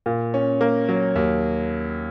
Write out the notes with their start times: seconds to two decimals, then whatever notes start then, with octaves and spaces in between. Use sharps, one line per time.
0.06 A#2
0.34 C#4
0.61 A#3
0.89 F#3
1.16 D#2